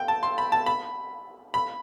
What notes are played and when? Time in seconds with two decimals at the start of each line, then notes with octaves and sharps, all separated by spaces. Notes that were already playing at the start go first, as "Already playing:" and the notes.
Already playing: G5
0.08 A5
0.23 C6
0.38 B5
0.52 A5
0.66 B5
1.54 B5